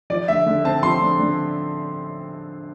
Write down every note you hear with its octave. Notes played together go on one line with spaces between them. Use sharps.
F3 D5
D3 E5
D3
C4 A5
F3 C6
D3
D3